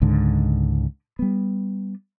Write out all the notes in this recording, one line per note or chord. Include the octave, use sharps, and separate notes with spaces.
C#2 G#2 D3
G3 B3